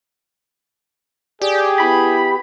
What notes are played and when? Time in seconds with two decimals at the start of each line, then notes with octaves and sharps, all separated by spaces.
1.42 G4 G#4 D5
1.80 B3 E4 B5